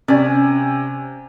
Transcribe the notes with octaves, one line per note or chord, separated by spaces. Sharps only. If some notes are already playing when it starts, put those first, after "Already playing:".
C3 C#4 D5 G#5